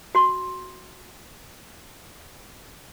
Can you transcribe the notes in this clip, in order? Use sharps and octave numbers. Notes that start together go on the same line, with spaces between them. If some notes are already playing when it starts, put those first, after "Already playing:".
F#4 C6